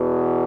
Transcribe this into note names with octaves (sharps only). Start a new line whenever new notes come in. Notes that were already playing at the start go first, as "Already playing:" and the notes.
Already playing: E2 B2